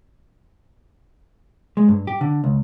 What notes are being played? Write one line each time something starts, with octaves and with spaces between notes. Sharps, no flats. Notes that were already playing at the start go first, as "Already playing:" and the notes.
G#3
G2
G4
D3
C#2